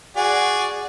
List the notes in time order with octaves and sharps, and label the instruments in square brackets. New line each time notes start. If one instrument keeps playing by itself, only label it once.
[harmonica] F#4 G#4 D5